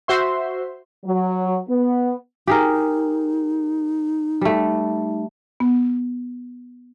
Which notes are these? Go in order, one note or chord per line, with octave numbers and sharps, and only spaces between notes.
F#4 C5 E5 C6
F#3
B3
D#4 G4 G#4 A#4
G3 A3
B3